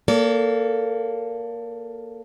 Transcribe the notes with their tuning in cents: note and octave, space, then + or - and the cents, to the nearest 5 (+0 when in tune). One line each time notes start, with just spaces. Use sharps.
A#3 +0 A4 +15 D5 -45